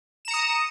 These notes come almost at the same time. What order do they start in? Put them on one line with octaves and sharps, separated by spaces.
E7 A#5 C#7 D#6